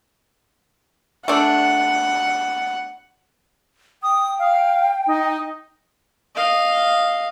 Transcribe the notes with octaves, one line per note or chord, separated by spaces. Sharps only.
A3 D4 F#5
G5 D#6
F5
D#4
D#5 F5